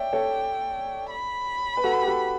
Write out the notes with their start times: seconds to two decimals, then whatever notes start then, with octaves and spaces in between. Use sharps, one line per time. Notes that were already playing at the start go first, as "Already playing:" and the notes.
Already playing: C#5 D5 E5 G5
0.13 A4 C#5
1.10 B5
1.77 B4
1.83 F#4 A4
2.02 G4
2.07 F#4 A4